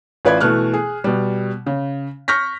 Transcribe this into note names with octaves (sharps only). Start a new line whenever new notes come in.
A1 F4 B4 D5 B5 G#6
B2 E3 A3 F6 F#6
G#4
B2 G3
C#3
C#6 F6 G6 A#6 B6